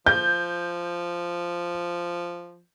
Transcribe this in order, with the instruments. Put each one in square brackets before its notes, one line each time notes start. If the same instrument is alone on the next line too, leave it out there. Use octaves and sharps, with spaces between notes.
[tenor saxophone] F3 [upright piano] G6